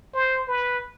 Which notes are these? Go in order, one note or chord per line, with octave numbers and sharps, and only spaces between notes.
C5
B4